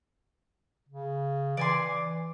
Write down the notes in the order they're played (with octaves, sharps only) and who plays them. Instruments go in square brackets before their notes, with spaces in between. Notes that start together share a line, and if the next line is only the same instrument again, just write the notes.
[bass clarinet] C#3
[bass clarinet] E3 [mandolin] D5 G#5 C6